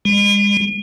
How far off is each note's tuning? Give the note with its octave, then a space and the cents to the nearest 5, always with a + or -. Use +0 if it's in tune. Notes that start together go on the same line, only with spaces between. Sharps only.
G#3 -40